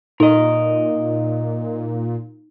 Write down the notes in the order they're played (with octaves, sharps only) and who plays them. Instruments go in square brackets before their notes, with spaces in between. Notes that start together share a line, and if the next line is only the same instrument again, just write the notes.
[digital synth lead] A#2 [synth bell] D#4 [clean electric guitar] A#4 D#5